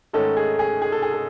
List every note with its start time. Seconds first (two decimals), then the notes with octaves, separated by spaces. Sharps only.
0.13 G#2 D#3 A3 C#4 A4
0.37 G#4
0.59 G#4
0.82 G#4
0.92 A4
1.02 G#4
1.12 A4